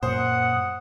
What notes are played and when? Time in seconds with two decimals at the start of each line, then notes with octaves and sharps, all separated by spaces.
0.03 F#2 A#2 C5 F#5 D#6